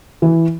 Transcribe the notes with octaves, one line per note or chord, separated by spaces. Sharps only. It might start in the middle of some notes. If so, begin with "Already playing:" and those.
E3